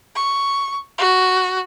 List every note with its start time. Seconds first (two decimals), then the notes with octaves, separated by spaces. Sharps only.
0.16 C#6
0.99 F#4